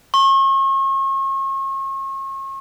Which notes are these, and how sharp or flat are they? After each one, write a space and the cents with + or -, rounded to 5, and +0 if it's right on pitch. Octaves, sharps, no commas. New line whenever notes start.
C#6 -40